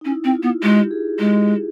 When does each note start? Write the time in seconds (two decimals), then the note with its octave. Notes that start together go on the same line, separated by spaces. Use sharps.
0.01 D#4
0.05 C#4 E4
0.24 C4 E4
0.34 F4
0.43 B3
0.62 G#3 G4
0.91 G#4
1.19 G#3